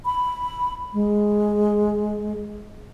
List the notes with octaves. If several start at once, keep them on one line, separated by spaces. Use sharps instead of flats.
B5
G#3